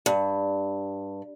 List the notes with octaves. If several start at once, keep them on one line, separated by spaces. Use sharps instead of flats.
G2